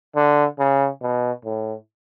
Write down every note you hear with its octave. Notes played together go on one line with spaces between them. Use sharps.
D3
C#3
B2
A2